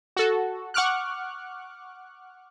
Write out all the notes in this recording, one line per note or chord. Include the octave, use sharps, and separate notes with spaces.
F#4 A4
F#5 C#6 D6 F6 F#6